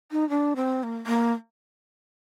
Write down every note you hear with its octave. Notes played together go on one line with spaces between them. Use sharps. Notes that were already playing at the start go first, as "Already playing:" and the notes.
D#4
D4
C4
A#3
A#3